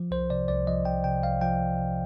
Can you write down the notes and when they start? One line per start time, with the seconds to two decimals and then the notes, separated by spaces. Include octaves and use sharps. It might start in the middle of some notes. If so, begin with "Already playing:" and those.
Already playing: F3
0.11 C2 C5
0.30 C3 D5
0.48 C2 D5
0.67 F3 D#5
0.85 C2 G5
1.04 C3 G5
1.23 C2 F5
1.41 F3 G5
1.60 C2
1.78 C3